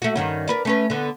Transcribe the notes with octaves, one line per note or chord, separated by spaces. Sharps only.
A3 F#4
G2 D#3 C#4
A#4 B4 D5
A3 C#4 B4
D3 B3